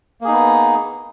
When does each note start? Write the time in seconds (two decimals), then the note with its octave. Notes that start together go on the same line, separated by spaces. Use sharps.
0.21 A#3
0.25 G#4
0.28 D#4
0.32 B3